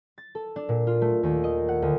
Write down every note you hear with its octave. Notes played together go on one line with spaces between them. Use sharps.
A6
A4
D4
A#2
F4
A3
D#2
D#5
F#5
D2